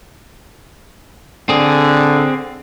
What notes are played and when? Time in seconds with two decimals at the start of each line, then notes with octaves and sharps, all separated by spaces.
1.49 D3 C4 G#4